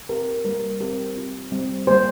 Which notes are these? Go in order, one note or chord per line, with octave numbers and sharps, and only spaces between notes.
C4 G4 A#4
G3 A#3 G4 A#4
C4 G4 A#4
C4 F4
G3 C4 G4
G3 A#3 G4 C5